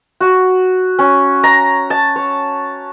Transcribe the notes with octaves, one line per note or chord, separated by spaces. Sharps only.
F#4
C#4
A#5
A5
C#5